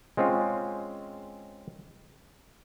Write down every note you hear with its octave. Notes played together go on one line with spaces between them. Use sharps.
G#3 C4 C#4 F4